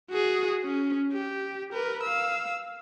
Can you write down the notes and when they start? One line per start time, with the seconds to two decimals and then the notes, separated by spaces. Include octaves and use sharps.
0.10 F#4 G#4
0.64 C#4
1.13 G4
1.73 A#4 B4
2.03 F5 E6